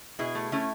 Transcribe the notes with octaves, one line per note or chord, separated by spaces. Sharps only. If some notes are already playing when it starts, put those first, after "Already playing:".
B2 E4 G#4
A3
A3 C#4 E4